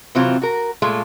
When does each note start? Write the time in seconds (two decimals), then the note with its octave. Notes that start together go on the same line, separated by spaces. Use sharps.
0.15 C3 E3 F#3 C4 F4
0.42 F#4 A#4
0.82 A#2 G#3 A3 F4